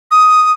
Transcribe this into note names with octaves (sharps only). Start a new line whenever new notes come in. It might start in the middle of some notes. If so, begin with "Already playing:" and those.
D#6